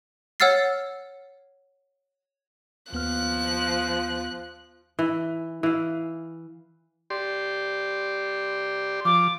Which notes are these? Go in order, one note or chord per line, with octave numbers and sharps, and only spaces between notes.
C#5 F#5 E6 F6 A6 C7
D#2 F3 B3 F6 F#6
E3
E3 F5
G4 D5 C6
F3 D6